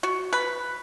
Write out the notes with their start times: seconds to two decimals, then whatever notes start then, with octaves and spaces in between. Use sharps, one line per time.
0.03 F#4
0.33 B4